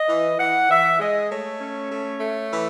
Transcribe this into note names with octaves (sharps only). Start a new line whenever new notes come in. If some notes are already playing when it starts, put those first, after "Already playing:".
Already playing: D#5
E3
E3 F#5
E3 E5
G#3 D#5
A3 C#5
C#4
A3
A3
E3